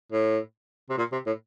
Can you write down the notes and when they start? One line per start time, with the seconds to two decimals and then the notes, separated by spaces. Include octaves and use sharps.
0.12 A2
0.90 C3
0.98 A#2
1.13 C3
1.27 A2